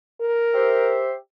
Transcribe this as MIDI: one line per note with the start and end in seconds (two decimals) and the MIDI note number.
0.21 1.02 70
0.54 1.13 67
0.54 1.13 72
0.54 1.13 76